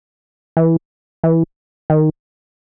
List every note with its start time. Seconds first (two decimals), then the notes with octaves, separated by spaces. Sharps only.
0.57 E3
1.24 E3
1.90 D#3